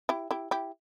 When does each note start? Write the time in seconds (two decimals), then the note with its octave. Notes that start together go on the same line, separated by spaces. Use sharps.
0.09 E4 G4
0.31 E4 G4
0.51 E4 G4